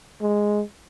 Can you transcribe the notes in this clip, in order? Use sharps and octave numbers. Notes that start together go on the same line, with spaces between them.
G#3